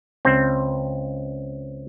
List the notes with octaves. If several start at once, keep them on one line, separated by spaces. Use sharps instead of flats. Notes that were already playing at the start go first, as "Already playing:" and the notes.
C#2 C4